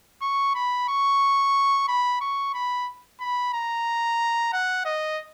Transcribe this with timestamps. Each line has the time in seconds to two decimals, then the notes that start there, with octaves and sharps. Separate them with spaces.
0.22 C#6
0.55 B5
0.89 C#6
1.88 B5
2.21 C#6
2.54 B5
3.20 B5
3.54 A#5
4.53 F#5
4.85 D#5